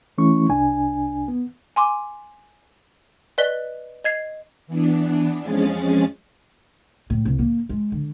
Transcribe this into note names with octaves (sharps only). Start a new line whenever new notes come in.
E3 A3 C#4 E4 C#6
C2 D4 G#5
B3
G#5 C6 D6
B4 D5 D#5 F#6 B6 G7
D#5 G#6 C7
E3 B3 D4
F2 F3 G#3 C#4 G#4 A6
A2
C2
A#3
G#3
D3